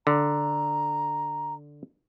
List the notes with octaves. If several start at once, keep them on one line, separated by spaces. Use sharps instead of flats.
D3 A#5